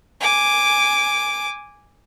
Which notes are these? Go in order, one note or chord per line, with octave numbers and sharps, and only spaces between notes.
G#5 D6